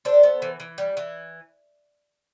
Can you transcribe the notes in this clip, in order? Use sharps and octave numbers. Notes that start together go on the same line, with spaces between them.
D4 A4 C5
B3
E3
E3
G3
E3